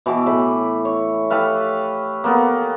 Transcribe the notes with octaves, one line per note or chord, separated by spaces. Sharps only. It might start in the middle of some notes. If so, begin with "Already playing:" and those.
B2 E3 E4 D6
A2 E3 B5
C#5
G4 A4 B4 F5
A#3 B3 A4